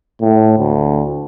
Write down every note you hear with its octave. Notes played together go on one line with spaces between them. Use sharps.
A2
D2